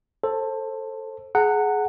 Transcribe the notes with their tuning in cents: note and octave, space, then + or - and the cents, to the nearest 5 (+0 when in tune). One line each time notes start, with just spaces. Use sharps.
A4 +10 C5 +25
G#4 +20 F#5 +0 A#5 -35